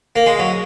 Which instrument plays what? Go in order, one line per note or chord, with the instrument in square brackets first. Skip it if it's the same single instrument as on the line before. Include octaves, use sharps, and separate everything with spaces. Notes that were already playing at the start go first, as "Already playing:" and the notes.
[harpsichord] A#3
G#3
F#3